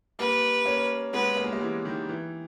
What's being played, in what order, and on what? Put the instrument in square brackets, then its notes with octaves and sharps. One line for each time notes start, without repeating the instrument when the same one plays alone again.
[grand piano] G3 A#3 [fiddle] B4
[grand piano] A#3 C#4
[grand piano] G#3 B3 [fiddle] B4
[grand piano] A#3
G#3
G3 A#3
E3 G#3
D#3 G3
E3